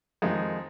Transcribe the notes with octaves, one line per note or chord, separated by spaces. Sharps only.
F2 D#3 G#3 D#4